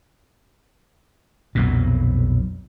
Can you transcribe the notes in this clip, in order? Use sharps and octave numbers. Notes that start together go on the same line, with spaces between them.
B1 F2 A#2